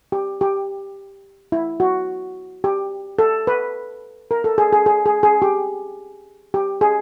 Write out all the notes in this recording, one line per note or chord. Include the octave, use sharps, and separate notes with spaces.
G4
G4
E4
F#4
G4
A4
B4
A#4
A4
G#4
G#4
G#4
G#4
G#4
G4
G4
G#4